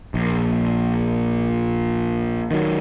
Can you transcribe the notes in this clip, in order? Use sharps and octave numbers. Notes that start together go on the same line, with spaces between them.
A#1
D#3 F#3